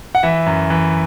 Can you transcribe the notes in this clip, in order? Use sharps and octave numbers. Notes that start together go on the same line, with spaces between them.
F#5
E3 E5
F#2
E3